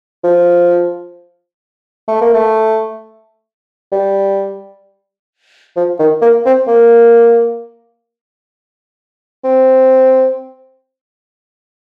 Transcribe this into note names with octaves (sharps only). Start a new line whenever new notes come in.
F3
A3
A#3
A3
G3
F3
D#3
A#3
C4
A#3
C4